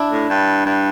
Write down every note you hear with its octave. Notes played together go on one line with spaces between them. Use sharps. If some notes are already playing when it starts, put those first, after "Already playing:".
Already playing: D4 E4
A2
G2
G2